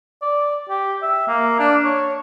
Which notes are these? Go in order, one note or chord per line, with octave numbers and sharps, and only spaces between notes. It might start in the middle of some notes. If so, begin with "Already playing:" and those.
D5
G4
E5
A#3
D4
C#5